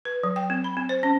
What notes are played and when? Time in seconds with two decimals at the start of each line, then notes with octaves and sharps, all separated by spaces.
0.05 B4
0.23 F#3
0.36 G5
0.50 C4
0.64 B5
0.77 C4
0.89 C5
1.03 C#4